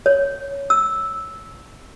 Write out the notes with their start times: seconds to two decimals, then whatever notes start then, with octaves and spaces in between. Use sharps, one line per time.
0.06 C#5
0.70 E6